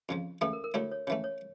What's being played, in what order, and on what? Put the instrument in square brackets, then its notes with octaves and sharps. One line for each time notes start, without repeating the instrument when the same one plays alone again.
[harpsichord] F2 C#3 F3
[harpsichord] E2 C#3 E3 A3 [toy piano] A4
[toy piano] A#4
A#4
[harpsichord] D2 D3 A3 E4 [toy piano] C#5
[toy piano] C#5
[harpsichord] C#3 E3 A3 [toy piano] C#5
[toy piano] C#5